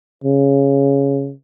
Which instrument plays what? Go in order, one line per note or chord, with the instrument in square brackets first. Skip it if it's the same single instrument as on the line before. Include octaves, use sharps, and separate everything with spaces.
[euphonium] C#3